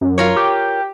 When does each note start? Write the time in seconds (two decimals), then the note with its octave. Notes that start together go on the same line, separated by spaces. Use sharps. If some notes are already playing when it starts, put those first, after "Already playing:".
0.01 F#2
0.18 F4 A#4 C#5
0.36 G4